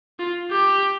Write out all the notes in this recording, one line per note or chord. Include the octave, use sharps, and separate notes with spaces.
F4
G4